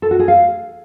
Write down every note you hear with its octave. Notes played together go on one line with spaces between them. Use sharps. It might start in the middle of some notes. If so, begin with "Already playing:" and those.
A4
F#4
G#4
F5